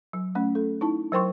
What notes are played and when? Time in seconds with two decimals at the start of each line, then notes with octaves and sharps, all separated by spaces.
0.13 F#3
0.35 A3 C#4
0.55 A4
0.81 D#4 E4 A5
1.12 F#3 A#4 C5 G5 C6 C#6